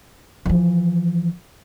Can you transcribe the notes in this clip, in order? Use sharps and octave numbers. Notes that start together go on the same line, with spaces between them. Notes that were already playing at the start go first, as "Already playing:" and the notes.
E3 F3